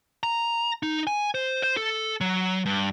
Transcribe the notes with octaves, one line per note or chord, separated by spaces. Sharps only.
A#5
D#4
G#5
C5
C5
A4
F#3
G2